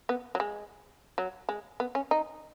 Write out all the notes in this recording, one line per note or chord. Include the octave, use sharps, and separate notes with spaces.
B3
F#3
G#3
F#3
G#3
B3
C#4
D#4